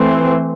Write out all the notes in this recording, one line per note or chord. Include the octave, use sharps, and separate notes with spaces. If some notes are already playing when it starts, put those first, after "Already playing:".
Already playing: E3 A3 C4